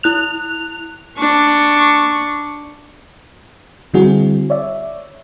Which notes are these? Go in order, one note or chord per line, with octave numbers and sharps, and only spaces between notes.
E4 F#6 F7
D4 C#6
D3 G3 C4 E4 F#4 G#4
C#5 D5 E5